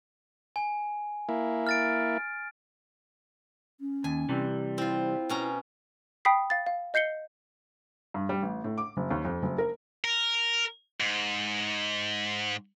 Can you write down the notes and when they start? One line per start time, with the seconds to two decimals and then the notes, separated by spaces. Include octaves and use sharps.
0.56 G#5
1.29 A#3 E4
1.67 F6 A6 D7
3.80 C#4
4.04 D#2 G#5
4.29 C3 E3 G3
4.78 C4 E4 F4
5.29 B2 C#4 A#5
6.25 G5 B5 D#6 B6 C7
6.50 F5 A6
6.67 F5
6.94 D#5 G6 C7 C#7 G7
8.14 G2
8.29 G3
8.43 A1
8.64 A2
8.78 D6
8.97 F#1
9.11 D#2
9.25 F2
9.43 F#1
9.58 A#4
10.04 A#4
11.00 G#2